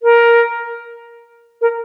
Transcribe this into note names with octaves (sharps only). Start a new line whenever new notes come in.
A#4
A#4